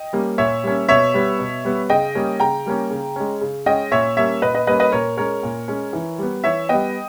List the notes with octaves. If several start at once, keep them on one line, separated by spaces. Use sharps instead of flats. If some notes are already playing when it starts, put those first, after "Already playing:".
Already playing: D#5 G5
G3 A#3 C#4
A#2 C#5 E5
G3 A#3 C#4
B2 C#5 E5
G3 B3
B2
G3 B3
C#3 D#5 G5
G3 A#3 C#4
C#3 G5 A#5
G3 A#3 C#4
C#3
G#3 C#4
C#3
G#3 C#4 D#5 G5
A#2 C#5 E5
G3 A#3 C#4 C#5 E5
A#2 B4 D#5
B4 D#5
G3 A#3 C#4 B4 D#5
B4 D#5
A#2 A#4 C#5
G#3 C#4 A#4 C#5
A#2
G#3 C#4
E3
G3 B3
E3 C#5 E5
G3 B3 D#5 G5